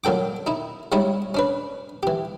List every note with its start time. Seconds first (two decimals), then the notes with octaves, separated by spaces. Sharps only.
0.04 A#2 F#3 A4 G5 D6
0.47 D#4 E4
0.92 G3 G#3 D#4 E4 C#5
1.34 C#4 D4 B4
2.03 E3 G4